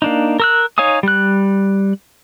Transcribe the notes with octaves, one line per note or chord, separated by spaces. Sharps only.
A#3 D4 D#4
A#4 E6 F#6
D#4 C#5 F5 G#5 D#6
G3 F#6